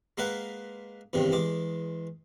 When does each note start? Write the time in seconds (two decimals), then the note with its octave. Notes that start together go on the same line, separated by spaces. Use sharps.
0.18 G#3 A#3 A#4 B4 F#5
1.13 E2 G2 C3 D#3
1.32 E2 G#3 D6